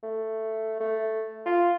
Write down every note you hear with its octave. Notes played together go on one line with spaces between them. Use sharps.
A3
A3
F4